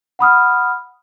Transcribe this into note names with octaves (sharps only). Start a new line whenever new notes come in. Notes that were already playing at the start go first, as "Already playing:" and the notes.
F#5 B5 D#6 F6